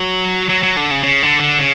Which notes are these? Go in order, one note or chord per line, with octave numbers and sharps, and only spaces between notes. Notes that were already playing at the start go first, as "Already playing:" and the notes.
Already playing: F#3
F#3
F#3
D3
C#3
C#3
D3
D3
C#3